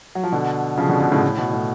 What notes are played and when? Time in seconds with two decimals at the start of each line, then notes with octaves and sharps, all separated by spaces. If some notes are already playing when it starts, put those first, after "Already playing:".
0.15 F#3
0.23 F3
0.32 B2 D3
0.78 C#3 F3
0.89 B2 D3
1.00 B2 D3
1.11 A2 C#3
1.23 A2
1.38 B2
1.53 A2